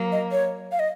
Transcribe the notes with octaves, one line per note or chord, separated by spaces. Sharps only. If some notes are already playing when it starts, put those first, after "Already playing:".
Already playing: F#3 A#3
D#5
C#5
F5
D#5